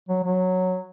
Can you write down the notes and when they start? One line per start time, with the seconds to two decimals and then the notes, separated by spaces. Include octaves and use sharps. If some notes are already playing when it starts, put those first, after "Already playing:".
0.09 F#3
0.24 F#3